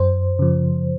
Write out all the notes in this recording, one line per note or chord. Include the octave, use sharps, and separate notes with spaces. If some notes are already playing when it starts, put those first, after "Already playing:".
Already playing: F#2 C5
C#3 F3